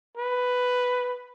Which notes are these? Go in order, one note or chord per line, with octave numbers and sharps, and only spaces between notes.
B4